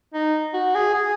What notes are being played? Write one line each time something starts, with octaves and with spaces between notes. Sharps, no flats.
D#4
F#4
G#4
G#4